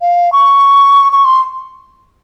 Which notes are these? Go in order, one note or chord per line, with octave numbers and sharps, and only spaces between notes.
F5
C#6
C#6
C6